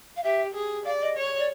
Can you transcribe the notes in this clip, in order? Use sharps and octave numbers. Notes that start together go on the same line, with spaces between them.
F5
G4 E5
G#4
D5 F5
D#5
C#5
D5